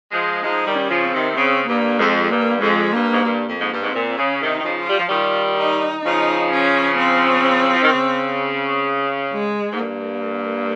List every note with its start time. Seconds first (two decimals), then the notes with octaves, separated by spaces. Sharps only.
0.12 F3 G#3
0.43 F3 G#3 D#4
0.66 D#3 G3
0.75 C#4
0.89 C#3 F3
1.05 C4
1.13 C3 D#3
1.37 C#3 C4
1.68 G2 A#3
1.99 F2 G#3
2.30 G2 A#3
2.61 F2 G#3
2.92 G2 A#3
3.13 G#2
3.24 G2
3.47 F2
3.55 A#3
3.61 G#2
3.71 G2
3.83 G#2 C4
3.94 A#2
4.17 C#3 C#4
4.41 C3 D#3
4.49 D#4
4.59 D#3
4.64 C#3 F3
4.79 F4
4.88 G3
4.99 F3
5.08 D#3 G3 F4
5.58 D#4
6.05 C#3 F3 D#4
6.52 C#4
6.99 C4
7.74 F3
7.83 D#3
7.92 C#3
9.33 G#3
9.72 G#2
9.80 G2 A#3